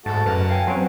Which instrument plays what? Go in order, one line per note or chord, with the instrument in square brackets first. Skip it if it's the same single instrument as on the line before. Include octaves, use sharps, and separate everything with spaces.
[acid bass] G#2 [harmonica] A3 F#4 [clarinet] A5
[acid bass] F#2 [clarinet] B4 [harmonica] F#5 A5 [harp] A#5 F6
[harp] F5 G5 G#5
[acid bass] F#3 [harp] C4 C#4 D7